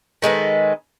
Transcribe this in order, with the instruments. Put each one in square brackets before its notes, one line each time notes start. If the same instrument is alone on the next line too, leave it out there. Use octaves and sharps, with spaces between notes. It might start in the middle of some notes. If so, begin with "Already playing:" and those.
[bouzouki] D#3 G#3 A4 B4